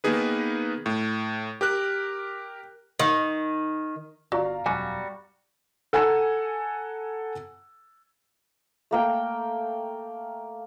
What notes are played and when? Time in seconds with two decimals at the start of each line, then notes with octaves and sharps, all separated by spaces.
0.04 D#3 A#3 B3 D#4 G#4 B4
0.86 A2
1.61 G4 A#4 F#6
3.00 D#3
4.32 G1 F#4 D5 F5 A#5
4.66 E1 F#2 G3 F#4 G#5
5.93 A4 F#5 G#5 A#5 E6
8.91 A3 A#3 G5